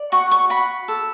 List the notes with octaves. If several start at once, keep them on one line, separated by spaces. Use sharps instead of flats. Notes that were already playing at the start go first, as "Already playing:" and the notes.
Already playing: D5
F#4 C#6
C#6
F#4 B5
A4